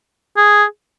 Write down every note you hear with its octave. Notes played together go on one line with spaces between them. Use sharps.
G#4